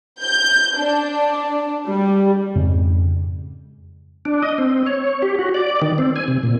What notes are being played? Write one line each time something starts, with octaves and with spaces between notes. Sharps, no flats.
G6
D4
G3
F2 G#2 C#3
D4
D#5
C4
C#5
G4
F#4
D5
D#3
C4
G#5
C3
A#2